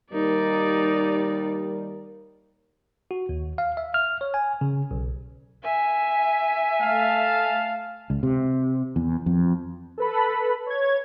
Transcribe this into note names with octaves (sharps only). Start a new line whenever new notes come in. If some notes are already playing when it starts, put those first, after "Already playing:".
D#2 G3 D#4 A#4 D5
F#4
D#2
F5
E5
F6
C#5
G#5
C#3
B1
E5 G#5
A3 F5 A5
C#2
C3
E2
F2
A4 B4 B5
C#5 G#6